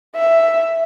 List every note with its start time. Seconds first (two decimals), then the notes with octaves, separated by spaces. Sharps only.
0.16 E5